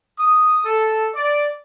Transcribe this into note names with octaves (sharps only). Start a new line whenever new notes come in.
D#6
A4
D5